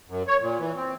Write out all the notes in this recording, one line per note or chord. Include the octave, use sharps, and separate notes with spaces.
F#2
C#5
A#2
E3
C4